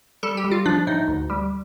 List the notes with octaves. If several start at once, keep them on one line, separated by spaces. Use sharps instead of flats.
G3 A4
G4
G3
F4
F3 D4
A2 D#4
D2
G3